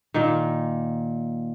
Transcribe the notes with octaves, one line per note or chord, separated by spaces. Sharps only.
A#2 D#3